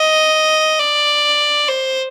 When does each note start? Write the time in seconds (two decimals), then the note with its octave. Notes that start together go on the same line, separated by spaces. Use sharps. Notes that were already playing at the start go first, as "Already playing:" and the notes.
Already playing: D#5
0.79 D5
1.68 C5